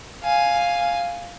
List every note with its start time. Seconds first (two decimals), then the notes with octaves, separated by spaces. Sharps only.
0.23 F5 G#5